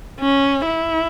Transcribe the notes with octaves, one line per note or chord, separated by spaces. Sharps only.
C#4
E4